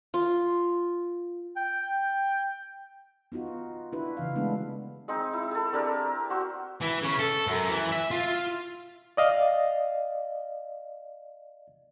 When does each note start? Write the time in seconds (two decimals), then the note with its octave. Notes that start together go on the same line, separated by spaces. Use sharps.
0.14 F4
1.57 G5
3.32 B3 D#4 F4 F#4
3.92 D4 E4 F#4 B4
4.17 C#3 E3 F5
4.35 G#3 A3 B3 D4 E4
5.08 G#3 C4 D#4
5.33 E4
5.51 G#4 A4
5.73 C4 D4 G4 A#4
6.30 F#4 C5
6.81 E3
7.02 C#3
7.19 A4
7.47 F#2
7.69 E3
7.92 E5
8.11 F4
9.17 D5 D#5 F5